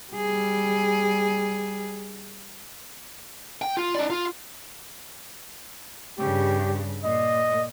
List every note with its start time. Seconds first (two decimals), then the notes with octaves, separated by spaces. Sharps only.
0.13 G3 G#4
3.62 G5
3.77 F4
3.95 D#4 D5
4.10 F4
6.19 G2 C#3 G4
7.04 A#2 D#5